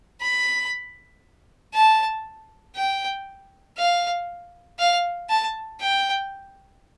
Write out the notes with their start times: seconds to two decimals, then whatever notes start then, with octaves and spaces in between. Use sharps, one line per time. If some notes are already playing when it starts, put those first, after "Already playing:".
0.21 B5
1.74 A5
2.76 G5
3.78 F5
4.79 F5
5.30 A5
5.80 G5